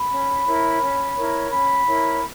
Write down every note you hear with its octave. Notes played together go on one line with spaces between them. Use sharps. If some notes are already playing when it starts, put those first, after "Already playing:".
Already playing: B5
C#4
E4 A#4 C#5
C#4
E4 A#4 C#5
C#4 B5
E4 A#4 C#5